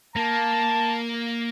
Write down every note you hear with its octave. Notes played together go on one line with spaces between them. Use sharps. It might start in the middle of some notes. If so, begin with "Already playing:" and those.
A#3 A5